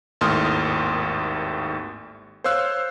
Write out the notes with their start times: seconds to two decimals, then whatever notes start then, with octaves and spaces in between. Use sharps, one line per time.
0.21 G#1 D#2 A2 C6 D#6 F6
2.44 C5 C#5 F5 E6 F#6